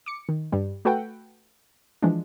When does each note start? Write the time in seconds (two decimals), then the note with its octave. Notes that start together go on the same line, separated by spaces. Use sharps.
0.06 D6 C#7
0.29 D#3
0.52 G2 G3
0.85 A3 F#4 A4 B4 F#5 G5
2.02 E3 F3 G#3 D4